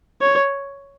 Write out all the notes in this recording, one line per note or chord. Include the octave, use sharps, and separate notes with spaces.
C#5